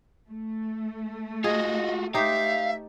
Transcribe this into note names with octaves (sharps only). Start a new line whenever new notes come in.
A3
F4 F#4 G#4 D#5
D#4 G4 C5 E5 F5